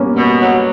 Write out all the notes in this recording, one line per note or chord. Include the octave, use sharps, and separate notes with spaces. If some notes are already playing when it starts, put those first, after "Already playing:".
Already playing: G3 A#3 B3 C#4
B2
F#3